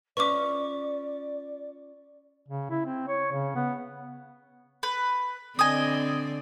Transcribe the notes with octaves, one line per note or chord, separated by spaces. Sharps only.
C#4 F4 B4 D5 C#6 D6
C#3
E4
C4
C#5
C#3
B3
B4
D3 C4 D5 D#5 G#5